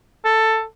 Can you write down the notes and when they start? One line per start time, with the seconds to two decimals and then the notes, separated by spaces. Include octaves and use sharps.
0.25 A4